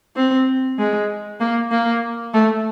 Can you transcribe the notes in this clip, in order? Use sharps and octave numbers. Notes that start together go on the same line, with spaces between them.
C4
G#3
A#3
A#3
A3